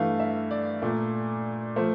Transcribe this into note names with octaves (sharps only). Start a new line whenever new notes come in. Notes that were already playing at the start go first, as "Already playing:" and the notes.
Already playing: G2 E3 A3 F5
E5
D5
A#2 A3
F3 A3 C5